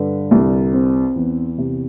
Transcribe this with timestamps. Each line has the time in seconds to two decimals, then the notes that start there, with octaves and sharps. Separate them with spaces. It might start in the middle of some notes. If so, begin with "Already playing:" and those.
Already playing: G2 D3 B4
0.31 C2
0.73 C4
1.16 E2
1.58 C3